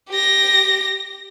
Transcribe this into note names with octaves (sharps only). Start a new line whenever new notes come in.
G4 A#6